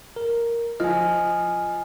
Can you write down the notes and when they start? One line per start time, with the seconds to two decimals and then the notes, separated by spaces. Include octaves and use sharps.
0.16 A#4
0.80 F3 D#5 G#5 F6